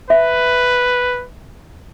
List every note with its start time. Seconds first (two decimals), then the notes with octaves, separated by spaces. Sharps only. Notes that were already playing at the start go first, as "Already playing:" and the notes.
0.10 B4 E5